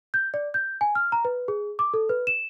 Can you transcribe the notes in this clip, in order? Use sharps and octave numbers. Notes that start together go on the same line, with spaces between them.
G6
D5
G6
G#5
F6
A#5
B4
G#4
D6
A4
B4
E7